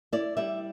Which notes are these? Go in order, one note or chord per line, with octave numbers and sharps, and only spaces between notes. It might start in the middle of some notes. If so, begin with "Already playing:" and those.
E4 D5
G3 E5